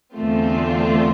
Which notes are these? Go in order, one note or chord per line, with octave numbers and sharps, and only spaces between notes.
E2 D3 A3 C4 F4